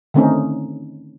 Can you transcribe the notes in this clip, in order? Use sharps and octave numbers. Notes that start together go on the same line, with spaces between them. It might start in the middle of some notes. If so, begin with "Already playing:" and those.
D3 D#3 A3 C4 C#4 D#4